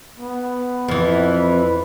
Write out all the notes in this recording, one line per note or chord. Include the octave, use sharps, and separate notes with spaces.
B3
F2 E3
B4